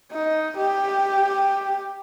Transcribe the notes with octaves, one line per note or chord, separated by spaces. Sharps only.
D#4
G4